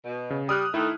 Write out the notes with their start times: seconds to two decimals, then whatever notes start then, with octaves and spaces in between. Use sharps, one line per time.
0.06 B2
0.30 C#3
0.49 G3 D#6 F6 F#6
0.74 D#3 A3 E4